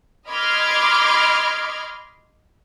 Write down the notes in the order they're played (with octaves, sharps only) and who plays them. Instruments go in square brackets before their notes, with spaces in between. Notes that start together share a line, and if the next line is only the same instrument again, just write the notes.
[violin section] D#5 B5 C6 D6 F6 G#6